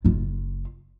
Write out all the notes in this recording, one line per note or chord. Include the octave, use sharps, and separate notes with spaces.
F#1 F4